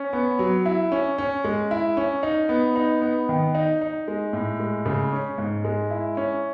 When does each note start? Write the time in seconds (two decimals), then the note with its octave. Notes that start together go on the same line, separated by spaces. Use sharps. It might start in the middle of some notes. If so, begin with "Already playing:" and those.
Already playing: C#4
0.13 B3
0.39 F#3
0.66 E4
0.92 C#4
1.18 C#4
1.44 G#3
1.71 E4
1.97 C#4
2.23 D#4
2.49 B3
2.76 D#4
3.02 B3
3.29 D#3
3.55 D#4
3.81 D#4
4.08 G#3
4.33 A2
4.60 G#3
4.86 C#3
5.12 C#4
5.38 G#2
5.64 G#3
5.91 E4
6.17 C#4